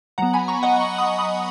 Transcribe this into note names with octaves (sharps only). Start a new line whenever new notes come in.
F#3 B3 F#5 A#5
G#5 B5
A#5 C#6
D#5 F#5
B5 D#6
B5 D#6